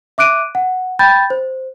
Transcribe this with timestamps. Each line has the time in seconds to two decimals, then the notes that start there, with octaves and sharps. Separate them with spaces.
0.18 E5 D6 F#6 D7 D#7
0.55 F#5
0.99 G5 B5 G6 A6
1.30 C5